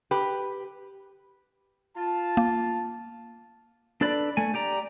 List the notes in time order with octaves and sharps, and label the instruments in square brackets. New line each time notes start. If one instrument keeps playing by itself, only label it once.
[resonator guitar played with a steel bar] G4 B4
[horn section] F4 A5
[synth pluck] A#3
[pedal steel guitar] D4 A4 B4 D5 B5
A3 G#5
G4 D5 A#5